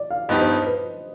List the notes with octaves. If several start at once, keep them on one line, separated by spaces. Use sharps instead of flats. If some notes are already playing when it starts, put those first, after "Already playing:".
Already playing: D5
F5
G2 F3 B3 D#4 G4 D#5
C5
C5
B4